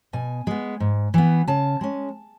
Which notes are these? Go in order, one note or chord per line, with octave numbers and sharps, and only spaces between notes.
B2 G#5
G#3 B3
G#2
E3 B3
C#3 A5
G#3 C#4